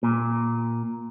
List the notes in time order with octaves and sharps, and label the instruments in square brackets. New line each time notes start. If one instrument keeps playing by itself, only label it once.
[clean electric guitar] A#2